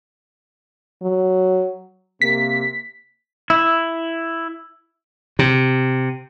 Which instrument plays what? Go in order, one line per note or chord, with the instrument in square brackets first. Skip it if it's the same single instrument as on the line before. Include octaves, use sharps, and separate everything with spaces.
[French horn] F#3
[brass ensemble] C3 A#3 [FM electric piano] B6
[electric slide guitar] E4
[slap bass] C3